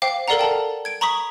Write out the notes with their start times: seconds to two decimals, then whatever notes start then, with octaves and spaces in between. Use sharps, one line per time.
0.02 C5 F5 G5 D6
0.28 A4 A#4 D5 F5 F#5 A#5
0.39 G5 A5
0.85 G#6 D7
1.01 A#5 B5 C#6 D#6 B6